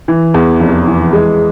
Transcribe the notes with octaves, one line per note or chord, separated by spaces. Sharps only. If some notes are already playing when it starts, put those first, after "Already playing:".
E3
E2
F1
E3
G#3